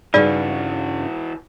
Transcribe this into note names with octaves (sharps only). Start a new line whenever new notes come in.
G2 C#3 E3 D#4 F#4 G#4 B4 D5